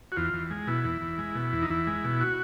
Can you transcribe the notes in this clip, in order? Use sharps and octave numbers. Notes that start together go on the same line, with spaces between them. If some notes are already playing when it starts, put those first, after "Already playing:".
F#4
E2 F4
E2
G#3
B2 E4
E2
E2
G#3
B2
E2
D#4
E2 E4
G#3
B2
F#4